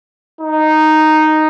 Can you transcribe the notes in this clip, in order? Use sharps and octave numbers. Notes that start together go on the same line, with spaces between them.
D#4